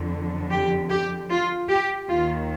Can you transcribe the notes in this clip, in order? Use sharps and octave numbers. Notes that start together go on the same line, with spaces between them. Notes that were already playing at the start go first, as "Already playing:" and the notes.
Already playing: F2 D3
G4
G4
F4
G4
D#2 D#3 F4